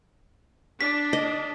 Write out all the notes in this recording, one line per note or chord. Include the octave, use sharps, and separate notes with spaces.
D4 B6
D#5